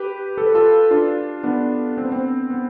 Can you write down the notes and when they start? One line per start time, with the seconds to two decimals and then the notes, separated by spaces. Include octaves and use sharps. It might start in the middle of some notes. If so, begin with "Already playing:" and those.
Already playing: G4 B4
0.38 A4
0.46 B4
0.54 F4 A4
0.91 D4 F4
1.43 B3 D4
1.97 C4
2.05 B3
2.12 C4
2.50 B3